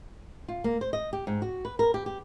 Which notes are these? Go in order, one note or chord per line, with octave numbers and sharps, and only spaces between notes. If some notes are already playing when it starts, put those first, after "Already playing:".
F4
A#3
C5
D#5
G4
G#2
F#4
B4
A#4
G4
G4